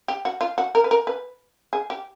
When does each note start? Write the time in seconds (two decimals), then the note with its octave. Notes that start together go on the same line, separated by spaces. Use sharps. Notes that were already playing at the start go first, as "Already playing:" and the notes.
0.08 G4
0.25 F#4
0.41 F4
0.58 F#4
0.75 A#4
0.84 B4
0.91 A#4
1.07 B4
1.73 G#4
1.90 G4